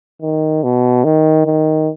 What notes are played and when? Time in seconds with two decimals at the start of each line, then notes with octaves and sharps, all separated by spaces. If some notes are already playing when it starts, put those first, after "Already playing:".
0.22 D#3
0.64 B2
1.05 D#3
1.46 D#3